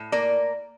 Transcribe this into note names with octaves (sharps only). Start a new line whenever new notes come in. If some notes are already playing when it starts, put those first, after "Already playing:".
Already playing: A2
A#3 A#4 D5